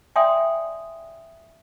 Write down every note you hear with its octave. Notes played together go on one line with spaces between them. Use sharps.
D5 E5 G5 G#5 C6 D#6